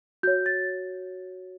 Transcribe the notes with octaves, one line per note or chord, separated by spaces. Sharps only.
F#4 C#5 G6
A6